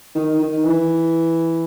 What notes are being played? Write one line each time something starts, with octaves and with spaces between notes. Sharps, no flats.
D#3
D#3
E3